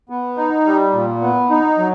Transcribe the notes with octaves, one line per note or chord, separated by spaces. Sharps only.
B3
D#4
G3
A#2
B3
D#4
F#3